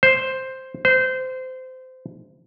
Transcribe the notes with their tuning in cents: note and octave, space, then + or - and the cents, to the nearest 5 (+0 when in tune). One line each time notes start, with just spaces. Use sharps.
C5 +0
C5 -25